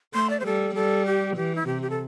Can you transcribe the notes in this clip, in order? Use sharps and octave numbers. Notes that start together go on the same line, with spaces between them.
A3 C6
D5
C5
G3 A4
G3 A4
G4
E3 G4
E4
C3 G4
G4
A4